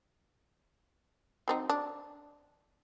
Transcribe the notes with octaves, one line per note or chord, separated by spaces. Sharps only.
F#3 C4 D#4
D4